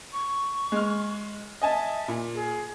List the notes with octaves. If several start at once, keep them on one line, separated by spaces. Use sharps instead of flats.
C#6
G#3 F6
D#5 E5 G#5 A5
A#2
G#4